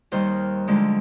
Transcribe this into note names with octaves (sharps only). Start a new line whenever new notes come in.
D#2 D#3 G3 C5
D2 D3 F3 G#3